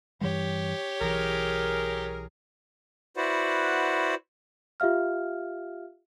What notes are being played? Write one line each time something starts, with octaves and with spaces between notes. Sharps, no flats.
G2 E3 G3 G4 C#5
B1 E3 G#4 A#4
E4 F#4 B4 C5 D5 F#5
F4 G4 E5 F5 F6